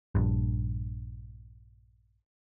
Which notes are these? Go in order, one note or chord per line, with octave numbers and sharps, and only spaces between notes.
A#1 G2